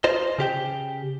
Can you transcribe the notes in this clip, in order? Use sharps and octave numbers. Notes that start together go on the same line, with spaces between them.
F4 C5 D#5
C#3 G4 G5